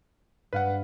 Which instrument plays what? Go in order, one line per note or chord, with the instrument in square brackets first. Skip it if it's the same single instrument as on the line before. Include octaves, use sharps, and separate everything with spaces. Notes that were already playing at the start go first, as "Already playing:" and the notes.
[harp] G2 [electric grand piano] B4 F5 F#5